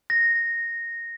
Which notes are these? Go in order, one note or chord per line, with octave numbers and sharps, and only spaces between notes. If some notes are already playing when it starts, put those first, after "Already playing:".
A#6